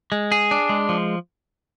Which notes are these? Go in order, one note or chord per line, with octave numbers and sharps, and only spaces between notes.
G#3
G#4
D4
G#3
F3